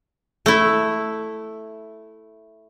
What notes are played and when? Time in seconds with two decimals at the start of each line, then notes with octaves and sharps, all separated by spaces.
0.46 A3 E4